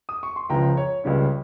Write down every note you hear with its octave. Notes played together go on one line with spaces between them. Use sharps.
D#6
C#6
C6
C#2 C#3 F3 G5 A#5
C#5
C#2 C#3 G3 C#4 C#5